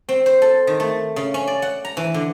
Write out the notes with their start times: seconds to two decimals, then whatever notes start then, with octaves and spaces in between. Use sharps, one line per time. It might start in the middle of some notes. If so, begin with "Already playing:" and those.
0.09 C4
0.26 C5
0.42 A4
0.67 D#3
0.80 A3
1.16 C#3
1.34 C#4
1.47 D5
1.62 F#5
1.85 A#5
1.97 E3
2.14 D3